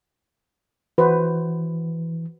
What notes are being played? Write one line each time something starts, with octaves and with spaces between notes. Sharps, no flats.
E3 F#4 B4 C5